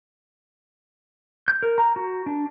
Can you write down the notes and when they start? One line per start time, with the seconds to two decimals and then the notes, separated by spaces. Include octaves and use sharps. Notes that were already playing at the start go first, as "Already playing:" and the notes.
1.48 G6
1.63 A#4
1.78 A#5
1.96 F#4
2.26 D4